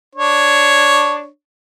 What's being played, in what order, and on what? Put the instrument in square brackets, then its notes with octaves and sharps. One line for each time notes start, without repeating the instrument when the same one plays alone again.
[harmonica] D4 C#5